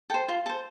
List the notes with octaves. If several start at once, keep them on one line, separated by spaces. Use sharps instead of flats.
A4 C5 G5
F4 C6
A4 C5 A5